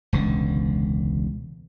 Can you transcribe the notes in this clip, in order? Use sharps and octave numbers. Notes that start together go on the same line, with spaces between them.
E1 C#2 D3